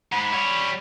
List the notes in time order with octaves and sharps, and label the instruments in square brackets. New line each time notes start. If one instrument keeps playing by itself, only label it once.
[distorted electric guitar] G#2 [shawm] B5
[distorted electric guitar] G3 C#5